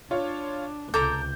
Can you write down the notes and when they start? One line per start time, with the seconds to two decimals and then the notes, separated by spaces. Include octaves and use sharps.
0.11 D4 F4 C#5
0.94 C#2 C3 A4 A#5 D6 G6